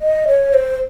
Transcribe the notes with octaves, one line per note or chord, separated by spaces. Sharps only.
D#5
C#5
C5